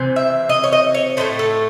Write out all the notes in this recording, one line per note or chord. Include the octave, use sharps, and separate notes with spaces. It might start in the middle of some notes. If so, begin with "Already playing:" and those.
Already playing: C3 E3 C4
E5
D#5
C#5
D#5
C#5
A2 F#3 A3 C5
A4